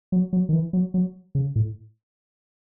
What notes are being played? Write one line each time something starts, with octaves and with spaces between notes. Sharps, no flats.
F#3
F#3
D#3
E3
F#3
F#3
C#3
A2